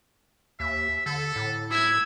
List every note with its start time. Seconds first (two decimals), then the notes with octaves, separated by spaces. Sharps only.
0.60 D#2 E5
1.06 D3 A4
1.36 A2
1.71 E4 E6 G#6